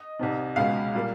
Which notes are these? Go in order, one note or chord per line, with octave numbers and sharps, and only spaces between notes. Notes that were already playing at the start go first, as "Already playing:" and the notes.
Already playing: D#5
C2 C3 D#3
C#2 B2 G#3 B3 F5
A#2 G3 A#3